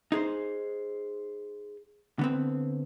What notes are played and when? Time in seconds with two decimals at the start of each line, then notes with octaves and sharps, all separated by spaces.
0.12 D#4 G#4 C5
2.19 D3 B3 C4